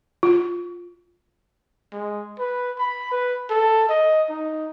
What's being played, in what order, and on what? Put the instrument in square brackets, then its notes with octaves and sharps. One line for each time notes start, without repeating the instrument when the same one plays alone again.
[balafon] F4
[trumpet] G#3
B4
B5
B4
A4
D#5
D#4